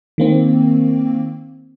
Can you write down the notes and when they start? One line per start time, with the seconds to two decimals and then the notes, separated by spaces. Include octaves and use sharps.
0.18 D#3 A#3 C4